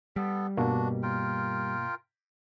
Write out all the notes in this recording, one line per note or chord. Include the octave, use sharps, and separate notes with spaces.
G3 B3 A4
G2 B2 A#3 D4 F#4
F4 A#4 G5